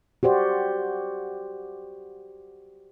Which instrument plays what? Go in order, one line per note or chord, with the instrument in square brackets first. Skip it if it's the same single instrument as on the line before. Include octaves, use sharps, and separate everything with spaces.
[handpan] F#4 G4 C5 D5